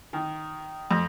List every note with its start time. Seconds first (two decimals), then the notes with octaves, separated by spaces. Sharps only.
0.13 D#3
0.91 F2